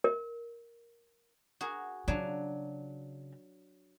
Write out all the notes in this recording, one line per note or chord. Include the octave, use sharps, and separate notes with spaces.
A#4
F#4 G#4 A#4
C#3 F#3 D4 F4